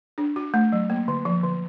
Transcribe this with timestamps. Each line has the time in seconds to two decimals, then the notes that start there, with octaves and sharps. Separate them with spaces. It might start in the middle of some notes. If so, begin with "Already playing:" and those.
0.18 D4
0.36 F#4
0.54 A3
0.72 F#3
0.90 A#3
1.08 D3
1.25 F3
1.44 D3